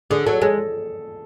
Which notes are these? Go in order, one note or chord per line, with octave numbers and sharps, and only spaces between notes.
D3 G#4
F#3 A4
G#3 A4